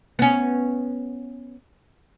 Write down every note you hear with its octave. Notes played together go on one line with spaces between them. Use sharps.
B3 C#4